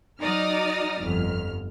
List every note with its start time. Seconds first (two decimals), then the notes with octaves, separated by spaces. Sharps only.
0.22 F#3 D#4 D5 D#6 F6
1.01 G1 F2 F6